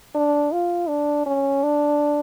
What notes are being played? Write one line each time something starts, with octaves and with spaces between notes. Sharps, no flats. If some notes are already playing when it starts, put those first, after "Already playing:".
D4
F4
D4
C#4
D4